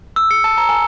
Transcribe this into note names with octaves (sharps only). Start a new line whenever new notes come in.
E6
C#7
A5
A#5
G#5